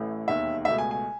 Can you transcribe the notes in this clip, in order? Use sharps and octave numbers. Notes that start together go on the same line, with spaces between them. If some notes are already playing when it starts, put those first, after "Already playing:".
Already playing: A1 A2 E3 A3
E1 D#2 D#3 E5
C#2 B2 A3 E5
G#5
G#5